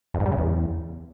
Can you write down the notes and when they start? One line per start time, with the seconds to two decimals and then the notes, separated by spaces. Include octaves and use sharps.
0.14 F2
0.20 G#2
0.26 G3
0.32 C#3
0.37 E2